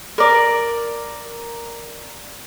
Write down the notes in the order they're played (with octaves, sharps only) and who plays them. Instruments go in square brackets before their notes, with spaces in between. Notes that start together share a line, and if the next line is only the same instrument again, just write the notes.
[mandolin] A#4 D5